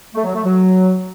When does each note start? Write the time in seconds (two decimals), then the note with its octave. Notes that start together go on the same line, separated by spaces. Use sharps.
0.15 A3
0.25 F#3
0.34 A3
0.44 F#3